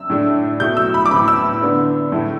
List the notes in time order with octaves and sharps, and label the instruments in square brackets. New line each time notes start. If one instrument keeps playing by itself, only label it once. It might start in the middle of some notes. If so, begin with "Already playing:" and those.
Already playing: [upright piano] E6
A2 A3 D4
B2 A3 E4 G6
E6
B5
D6
A2 E3 B3 B5
E6
D3 B3 D4
A2 E3 A3 E4